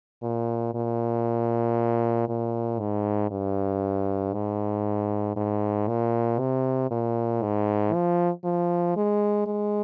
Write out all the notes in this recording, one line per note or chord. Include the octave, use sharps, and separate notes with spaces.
A#2
A#2
A#2
G#2
G2
G#2
G#2
A#2
C3
A#2
G#2
F3
F3
G#3
G#3